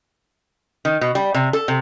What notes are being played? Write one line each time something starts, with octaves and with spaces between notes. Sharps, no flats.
D#3
B2
G3
C3
A4
C3